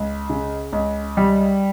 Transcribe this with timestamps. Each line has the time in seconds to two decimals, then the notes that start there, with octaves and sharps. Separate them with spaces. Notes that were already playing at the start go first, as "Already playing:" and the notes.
Already playing: C#2
0.30 C#3
0.72 C#2
1.17 G3